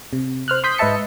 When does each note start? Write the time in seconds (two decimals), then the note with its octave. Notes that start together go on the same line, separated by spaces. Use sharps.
0.13 C3
0.48 C5 F6 F#6
0.64 C6 D#6 G6 B6
0.78 G#2 B4 D#5 E5 A5 C#7